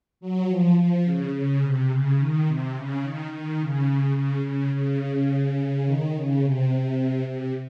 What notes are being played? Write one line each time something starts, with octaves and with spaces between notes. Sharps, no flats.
F#3
F3
F3
C#3
C#3
C3
C#3
D#3
C3
C#3
D#3
D#3
C#3
C#3
C#3
C#3
D#3
C#3
C3
C3